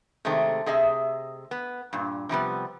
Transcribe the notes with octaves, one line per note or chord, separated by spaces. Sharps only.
C3 D#3 G#3 A3 C4
C3 G#4 D#5 E5
B3
G2 A#2
C3 F3 G3 B3